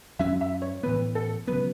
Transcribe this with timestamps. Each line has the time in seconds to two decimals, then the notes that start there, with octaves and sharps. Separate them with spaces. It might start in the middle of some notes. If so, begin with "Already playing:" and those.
0.19 F#2 F#3 C#4 E5
0.41 E5
0.62 C#5
0.83 A2 E3 B3 B4
1.15 A4
1.47 C#3 F#3 B3 B4